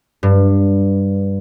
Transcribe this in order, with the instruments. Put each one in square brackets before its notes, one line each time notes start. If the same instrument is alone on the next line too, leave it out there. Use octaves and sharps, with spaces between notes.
[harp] G2